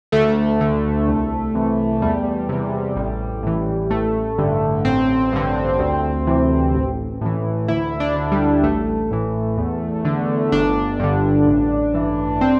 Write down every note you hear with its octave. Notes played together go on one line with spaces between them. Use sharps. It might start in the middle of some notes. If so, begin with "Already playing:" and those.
D2 A3
D3
C2
C3 E3
E2 G3
C3 E3
A1
A2 E3
A1 A3
G2 D3
A1 C4
G2 D3
D2
C3 E3
A1
A2 E3
D2 E4
D4
D3
G3
A1 A3
A2 E3
E2
D3
G1 D4
G2 D3
A1
G2 E3
C4